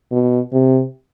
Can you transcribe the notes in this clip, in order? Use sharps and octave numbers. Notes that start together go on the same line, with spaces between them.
B2
C3